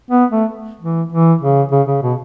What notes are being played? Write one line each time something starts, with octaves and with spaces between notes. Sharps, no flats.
B3
A3
E3
E3
C#3
C#3
C#3
B2